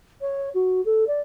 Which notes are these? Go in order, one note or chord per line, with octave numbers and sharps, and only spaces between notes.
C#5
F#4
A4
D5